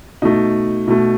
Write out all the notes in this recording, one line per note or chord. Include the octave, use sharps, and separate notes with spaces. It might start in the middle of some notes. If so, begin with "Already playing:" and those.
B2 A3 D#4
B2 A3